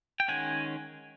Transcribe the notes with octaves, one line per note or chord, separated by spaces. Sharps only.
G5
D#3 G#3 C#4 F#5 G#5